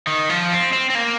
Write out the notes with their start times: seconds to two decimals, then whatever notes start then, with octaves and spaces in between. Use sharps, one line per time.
0.07 D#3
0.29 F3
0.52 C4
0.73 C4
0.90 C4
0.95 A#3